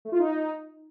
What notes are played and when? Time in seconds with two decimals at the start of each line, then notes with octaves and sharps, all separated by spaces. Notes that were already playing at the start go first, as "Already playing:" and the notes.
0.05 A3
0.12 F4
0.19 D#4